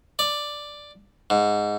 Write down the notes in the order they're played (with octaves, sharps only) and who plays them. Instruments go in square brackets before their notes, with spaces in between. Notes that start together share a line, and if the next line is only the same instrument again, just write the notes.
[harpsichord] D5
G#2